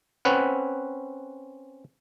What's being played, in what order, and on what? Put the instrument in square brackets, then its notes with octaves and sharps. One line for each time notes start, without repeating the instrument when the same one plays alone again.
[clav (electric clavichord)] C4 C#4 B4 F#5